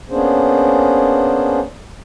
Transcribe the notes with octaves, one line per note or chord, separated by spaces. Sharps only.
A#3 B3 C#4 D4 G#4 C5